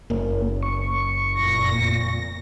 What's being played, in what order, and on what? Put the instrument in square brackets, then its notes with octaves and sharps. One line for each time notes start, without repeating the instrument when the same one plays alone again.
[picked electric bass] F#1 [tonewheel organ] A#3
[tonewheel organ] C#6
[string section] F2 A#2 A#6